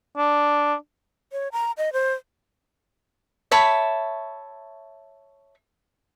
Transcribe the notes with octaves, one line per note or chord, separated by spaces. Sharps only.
D4
C#5
A#5
D#5
C5
C#5 E5 A5 B5